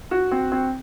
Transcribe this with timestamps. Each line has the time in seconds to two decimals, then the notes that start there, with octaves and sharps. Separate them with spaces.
0.11 F#4
0.31 C4
0.52 C4